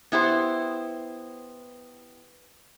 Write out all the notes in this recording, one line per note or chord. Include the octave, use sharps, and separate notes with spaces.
B3 E4 G4 C5